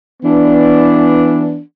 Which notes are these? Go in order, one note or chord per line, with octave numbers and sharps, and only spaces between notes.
E3 B3 D4